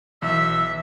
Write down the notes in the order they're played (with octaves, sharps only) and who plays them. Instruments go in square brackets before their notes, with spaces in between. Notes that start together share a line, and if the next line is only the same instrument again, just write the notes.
[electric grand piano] B1 [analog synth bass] E3 [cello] E5 [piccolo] E6